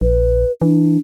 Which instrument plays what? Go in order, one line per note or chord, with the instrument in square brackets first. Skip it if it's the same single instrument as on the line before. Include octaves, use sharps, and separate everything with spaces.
[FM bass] A#1 [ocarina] B4
[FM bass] E3 [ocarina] D4